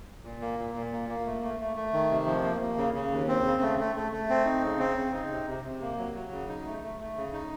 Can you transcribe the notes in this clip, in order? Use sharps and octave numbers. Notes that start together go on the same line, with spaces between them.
A#2
A#3
A#2
A#2
A#3
A#3
A3
A3
A3
A3
D#3
C3
F3
A#3
A#3
C#3
C#3
D#2
C4
C#3
A3
A3
A3
A3
C4
D#4
C#3
C4
C#3
D#4
C3
C3
C3
A#3
F#3
F#3
C#3
D#4
A3
A3
A3
C#3
D#4